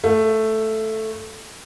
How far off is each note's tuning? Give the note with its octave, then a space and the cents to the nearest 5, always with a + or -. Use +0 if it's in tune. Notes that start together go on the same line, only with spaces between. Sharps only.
A3 +0 F5 -20